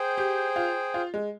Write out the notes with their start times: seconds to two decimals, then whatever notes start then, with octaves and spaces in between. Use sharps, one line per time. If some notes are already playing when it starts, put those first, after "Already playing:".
Already playing: G#4 C5 G5
0.18 G4
0.56 F4
0.94 F4
1.14 G#3